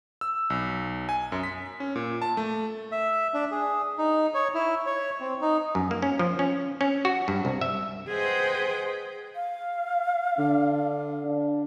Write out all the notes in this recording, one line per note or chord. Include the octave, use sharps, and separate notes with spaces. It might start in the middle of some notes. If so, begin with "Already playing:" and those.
E6
B1
G#5
F#2
B6
C#4
A#2
A5
A3
E5
D4
G#4
D#4
C#5
E4
C#5
C4
D#4
F#2
A#3
C#4
F3
C#4
C#4
F#4
G2
C2
E5
G#4 B4 C5 D#5 F#5 G5
F5
D3 D4
D4